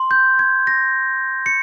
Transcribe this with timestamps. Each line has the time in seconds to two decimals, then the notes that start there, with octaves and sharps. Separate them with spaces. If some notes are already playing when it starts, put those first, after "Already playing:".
Already playing: C6
0.11 G6
0.39 G#6
0.67 A#6
1.46 C#7